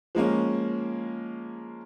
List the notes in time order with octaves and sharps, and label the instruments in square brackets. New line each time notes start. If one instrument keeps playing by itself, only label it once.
[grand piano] F3 G#3 A#3 C#4